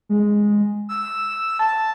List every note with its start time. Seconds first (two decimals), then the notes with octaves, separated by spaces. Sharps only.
0.09 G#3
0.89 E6
1.59 A5